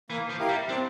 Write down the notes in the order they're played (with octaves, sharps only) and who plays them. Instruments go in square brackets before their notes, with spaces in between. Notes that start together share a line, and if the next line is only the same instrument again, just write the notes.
[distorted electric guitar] E3 [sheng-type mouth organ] A#3
[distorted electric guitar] F3
[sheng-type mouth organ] E4 G4 A#4 F5
[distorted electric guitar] G3
[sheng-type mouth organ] C4 [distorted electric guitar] D4